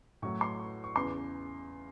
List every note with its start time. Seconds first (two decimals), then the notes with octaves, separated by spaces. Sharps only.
0.22 A2 F#3 C#6
0.41 C6
0.60 C#6
0.84 C#6
0.96 E2 C#3 E3 C6